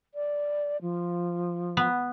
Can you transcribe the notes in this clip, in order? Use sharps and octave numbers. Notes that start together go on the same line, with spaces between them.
D5
F3
B3